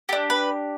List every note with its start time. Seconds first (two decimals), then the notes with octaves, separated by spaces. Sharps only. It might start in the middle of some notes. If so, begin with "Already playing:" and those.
0.09 G4 A4
0.13 D4
0.30 B4